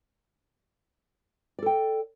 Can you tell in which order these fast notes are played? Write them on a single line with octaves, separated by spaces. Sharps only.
D5 A4 G5